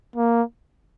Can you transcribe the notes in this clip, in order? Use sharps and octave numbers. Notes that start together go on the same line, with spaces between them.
A#3